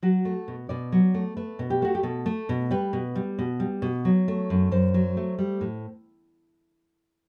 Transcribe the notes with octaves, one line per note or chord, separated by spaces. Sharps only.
F#3 F#4
A3
B2
B2 D5
F#3
A3
A3 B4
B2
G4
A3 F#4
G4
B2 A4
A3
B2
G3 B4
B2
G3
B2
G3
B2
F#3
A3
F#2
F#2 C5
F#3
A3
G3
A2